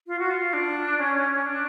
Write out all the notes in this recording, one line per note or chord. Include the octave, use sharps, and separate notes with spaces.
F4
F#4
F4
D4
C#4
D4